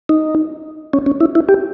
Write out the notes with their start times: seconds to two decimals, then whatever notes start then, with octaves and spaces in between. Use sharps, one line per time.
0.09 D#4
0.93 C#4
1.06 C#4
1.21 E4
1.35 E4
1.49 G4